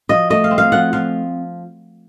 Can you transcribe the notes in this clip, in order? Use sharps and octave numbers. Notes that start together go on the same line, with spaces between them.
F3 D#5
A3 D#5
F5
C4
F5
F3 F#5
F3 F5